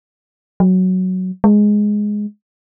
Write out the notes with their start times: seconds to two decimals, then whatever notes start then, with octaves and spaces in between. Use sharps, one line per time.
0.60 F#3
1.44 G#3